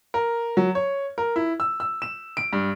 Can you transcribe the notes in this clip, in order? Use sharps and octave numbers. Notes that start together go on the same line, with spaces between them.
A#4
F#3
C#5
A#4
E4
E6
E6
E7
D7
G2